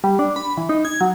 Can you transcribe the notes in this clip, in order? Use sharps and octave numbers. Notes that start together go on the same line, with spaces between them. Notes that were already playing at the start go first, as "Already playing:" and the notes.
G3
D4
B5
E3
D#4
G#6
F#3